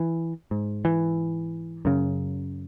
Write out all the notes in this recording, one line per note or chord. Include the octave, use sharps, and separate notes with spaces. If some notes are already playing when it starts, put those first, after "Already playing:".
Already playing: E3
G#2
E3
F#2 C#3